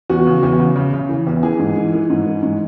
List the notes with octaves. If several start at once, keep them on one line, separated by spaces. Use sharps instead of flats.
E2 F#4
C#3
E2
C#3
C#3
C#3
E3
E2
E3 G#4
G#2
E3
E3
G#2
E3
G#2